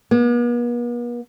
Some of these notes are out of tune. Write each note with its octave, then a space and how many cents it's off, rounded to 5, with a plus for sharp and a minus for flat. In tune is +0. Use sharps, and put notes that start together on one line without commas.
B3 -45